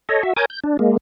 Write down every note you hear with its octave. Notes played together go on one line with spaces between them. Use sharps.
A4 C#5 D#5
F#4 E5
A#4 C#5 G#5 D6 D#6 G6
G6
D4
G#3 A#3